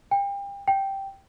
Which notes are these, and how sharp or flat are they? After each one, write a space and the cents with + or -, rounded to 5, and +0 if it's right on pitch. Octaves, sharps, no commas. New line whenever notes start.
G5 +35
G5 -5